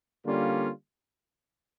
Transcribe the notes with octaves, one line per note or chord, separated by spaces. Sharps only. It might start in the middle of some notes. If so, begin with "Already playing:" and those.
D3 G3 A#3 C#4 F4